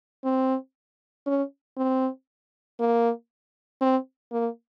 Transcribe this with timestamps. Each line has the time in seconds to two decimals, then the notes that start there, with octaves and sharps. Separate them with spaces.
0.24 C4
1.26 C#4
1.77 C4
2.79 A#3
3.81 C4
4.32 A#3